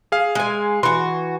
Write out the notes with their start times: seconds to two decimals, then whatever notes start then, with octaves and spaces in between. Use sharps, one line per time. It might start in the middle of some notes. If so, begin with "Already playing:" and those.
0.12 G#4 F5
0.35 G#3 G#5
0.83 E3 F#4 C6